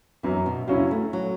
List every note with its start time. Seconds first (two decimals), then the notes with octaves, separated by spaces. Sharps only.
0.23 F#2 E3
0.46 B2
0.68 C#3 F#3 C#4 E4
0.91 A3
1.13 F#3